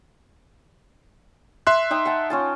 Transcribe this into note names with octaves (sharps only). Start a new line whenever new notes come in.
E5 C6 F#6
D#4 G5 D#6
F#5 G5 A5
C#4 F4 A5